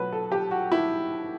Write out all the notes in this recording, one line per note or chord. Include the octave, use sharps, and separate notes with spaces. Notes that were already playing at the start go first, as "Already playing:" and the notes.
Already playing: B2 F#3 A3 B4
A4
G4
F#4
E4